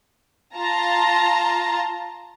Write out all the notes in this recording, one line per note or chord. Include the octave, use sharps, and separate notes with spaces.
F4 A5 A#5